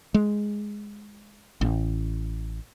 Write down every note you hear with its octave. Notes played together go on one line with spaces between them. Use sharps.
G#3
A1